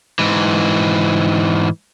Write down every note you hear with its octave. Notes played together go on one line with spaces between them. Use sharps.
G#2 E3